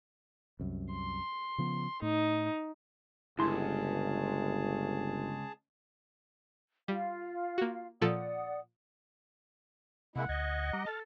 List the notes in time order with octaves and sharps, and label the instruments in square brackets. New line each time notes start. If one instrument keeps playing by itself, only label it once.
[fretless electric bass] C2 F#2
[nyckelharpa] C6
[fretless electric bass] C#3 F3 B3
[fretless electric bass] A2 [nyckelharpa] D#4
[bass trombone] G1 [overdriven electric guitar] C#2 [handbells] E4 C6 [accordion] G#4 A5
[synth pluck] G3 [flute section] F4 F5
[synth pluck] A#3 F#4
[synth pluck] A#2 F3 A4 [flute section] D5 F#5 D#6
[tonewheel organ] C3 [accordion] G#3 A#3 E4 [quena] F#5
[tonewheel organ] D2 G#6 [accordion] D#5
[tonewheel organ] G3 A#5 D6
[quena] A4 [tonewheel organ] A5 F6 A6